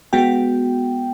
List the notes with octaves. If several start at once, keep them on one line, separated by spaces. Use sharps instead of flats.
G#3 B3 F#4 G5